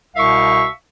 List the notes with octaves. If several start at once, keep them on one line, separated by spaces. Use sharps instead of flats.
C2 B2 E5 F5 C#6